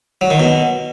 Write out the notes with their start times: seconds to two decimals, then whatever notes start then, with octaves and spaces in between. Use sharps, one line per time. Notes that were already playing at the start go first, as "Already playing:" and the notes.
0.21 F#3
0.30 D#3
0.40 B2